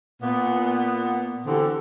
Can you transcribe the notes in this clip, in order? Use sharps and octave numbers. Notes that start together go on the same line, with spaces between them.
A#2 B3
D3 E3 C4 F#4 G4 A4